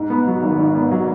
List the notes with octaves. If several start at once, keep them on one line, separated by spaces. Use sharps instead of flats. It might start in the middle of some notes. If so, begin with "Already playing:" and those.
Already playing: G#2
B3
F#3
G#1
G#2
B3
F#3